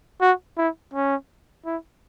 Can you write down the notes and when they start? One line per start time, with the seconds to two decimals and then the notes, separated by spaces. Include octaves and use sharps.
0.21 F#4
0.57 E4
0.94 C#4
1.66 E4